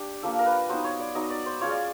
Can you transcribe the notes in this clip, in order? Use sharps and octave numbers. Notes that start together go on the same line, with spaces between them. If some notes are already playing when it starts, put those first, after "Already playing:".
Already playing: D4 G4
F3 A#3 D4 A4
A#4
B4
F#3 B3 D#4 C5
C#5
D5
F#3 B3 D#4 D#5
D5
C5
G#3 C#4 F4 C#5
D5